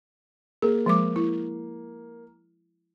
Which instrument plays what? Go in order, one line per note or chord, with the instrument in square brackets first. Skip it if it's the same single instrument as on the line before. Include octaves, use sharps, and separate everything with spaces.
[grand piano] A#3 [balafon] G#4
[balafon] F3 G#3 D6
E4